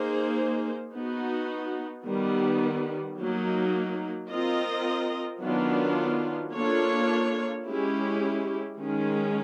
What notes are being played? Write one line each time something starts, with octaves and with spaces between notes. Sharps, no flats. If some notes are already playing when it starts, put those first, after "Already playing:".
Already playing: A#3 D#4 G#4 C5
B3 D#4 F#4
D#3 G3 B3
F#3 A#3 D#4
C4 F4 A#4 D#5
D#3 F#3 B3 D4 F4
A#3 D4 F4 A4 C#5
G#3 C#4 E4 G4
D#3 G#3 C#4